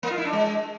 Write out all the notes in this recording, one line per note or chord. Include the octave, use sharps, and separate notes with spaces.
A#3
F4
E4
D4
G#3